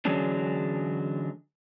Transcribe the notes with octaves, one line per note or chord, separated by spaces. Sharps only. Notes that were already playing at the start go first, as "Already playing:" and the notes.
D3 E3 F#3 G#3 C#4 D4